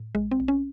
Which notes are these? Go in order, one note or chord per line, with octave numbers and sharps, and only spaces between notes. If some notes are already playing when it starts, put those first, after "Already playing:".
Already playing: A2
A#1 G#3
C4
A#1
C#4